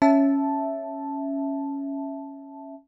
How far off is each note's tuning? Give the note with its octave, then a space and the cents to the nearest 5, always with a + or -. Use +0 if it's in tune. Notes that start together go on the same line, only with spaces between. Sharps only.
C#4 +0 E5 +0 A5 -5